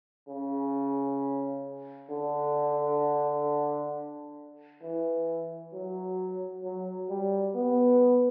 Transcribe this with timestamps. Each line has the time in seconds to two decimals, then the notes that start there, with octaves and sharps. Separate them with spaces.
0.28 C#3
2.10 D3
4.82 E3
5.73 F#3
6.64 F#3
7.10 G3
7.55 B3